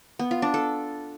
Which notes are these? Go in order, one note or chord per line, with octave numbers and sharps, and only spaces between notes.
B3
F4
D4
A4